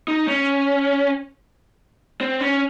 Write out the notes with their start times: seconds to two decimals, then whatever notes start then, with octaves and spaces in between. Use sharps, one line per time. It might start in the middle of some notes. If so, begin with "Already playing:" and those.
0.08 D#4
0.28 C#4
2.21 C4
2.40 C#4